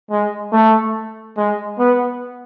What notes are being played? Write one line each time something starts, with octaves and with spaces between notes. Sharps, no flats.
G#3
A3
G#3
B3